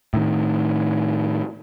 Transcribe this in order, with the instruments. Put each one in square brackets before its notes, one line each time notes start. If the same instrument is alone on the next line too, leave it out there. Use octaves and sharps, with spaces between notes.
[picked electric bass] A2 D#3